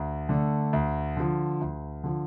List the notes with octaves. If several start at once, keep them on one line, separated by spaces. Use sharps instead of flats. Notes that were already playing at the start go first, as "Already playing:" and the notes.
Already playing: D2
D3 A3 D4
D2
D3 F3
D2
D3 F3